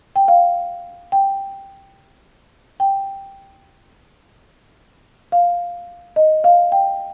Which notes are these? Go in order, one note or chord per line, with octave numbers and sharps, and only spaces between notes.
G5
F5
G5
G5
F5
D#5
F5
G5